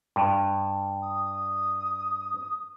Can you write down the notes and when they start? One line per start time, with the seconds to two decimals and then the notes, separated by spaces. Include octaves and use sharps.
0.16 G2
1.02 D#6